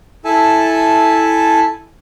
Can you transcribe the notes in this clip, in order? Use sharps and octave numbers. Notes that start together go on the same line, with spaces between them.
E4 A4 E5 G#5 A5